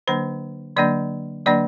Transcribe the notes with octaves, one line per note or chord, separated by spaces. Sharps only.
D3 F#3 A#3 D4 C5
D3 F#3 A#3 D4 D5
D3 F#3 A#3 D4 D5